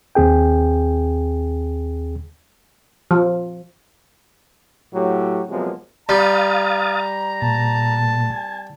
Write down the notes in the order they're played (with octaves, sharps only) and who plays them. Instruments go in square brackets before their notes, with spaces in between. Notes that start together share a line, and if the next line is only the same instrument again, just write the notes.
[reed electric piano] D#2 C4 G#4 G5
[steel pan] F3
[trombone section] A2 F#3 G4
C3 F3 F#3 G#3 A#3 B3
[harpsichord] G3 [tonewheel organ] F5 D#6 A6 [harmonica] A#5
[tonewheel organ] A#2 [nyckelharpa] A5
[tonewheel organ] G#5